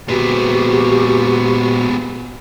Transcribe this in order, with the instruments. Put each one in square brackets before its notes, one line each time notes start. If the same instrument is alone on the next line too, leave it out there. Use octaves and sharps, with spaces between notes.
[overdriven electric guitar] A#2 C4 [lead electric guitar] G#3 B3 [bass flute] F#4 [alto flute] G4